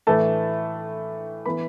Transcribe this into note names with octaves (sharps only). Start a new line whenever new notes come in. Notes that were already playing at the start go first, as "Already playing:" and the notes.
A2 E3 A3 A5
E3 B3 B5